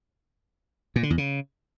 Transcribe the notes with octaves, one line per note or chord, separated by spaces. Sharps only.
A#2
D3
E2
C#3